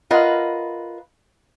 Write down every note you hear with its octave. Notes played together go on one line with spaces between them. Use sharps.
F4 A#4 B4 D#5 F#5